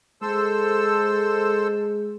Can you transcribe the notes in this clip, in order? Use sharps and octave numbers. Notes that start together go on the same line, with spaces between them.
G#3 A4 C5 E6